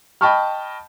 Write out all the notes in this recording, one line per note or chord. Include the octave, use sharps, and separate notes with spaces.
D#5 G5 A5 B5 C#6 F6